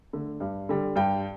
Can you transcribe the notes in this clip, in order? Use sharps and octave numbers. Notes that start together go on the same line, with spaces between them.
D3 A3
G2
D3 G3
G2 G5